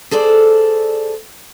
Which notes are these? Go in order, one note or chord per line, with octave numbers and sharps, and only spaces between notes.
G#4 A4 C5 D5